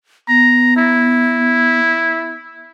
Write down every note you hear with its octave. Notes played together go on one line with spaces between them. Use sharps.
B3 A#5
E4